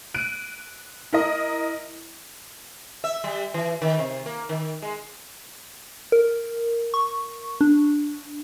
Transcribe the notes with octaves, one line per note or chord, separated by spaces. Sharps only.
F#6 D7 D#7
E4 A#4 D#5
E5
G3
E3
D#3
C3
A#3
D#3
G#3
A#4
C#6
D4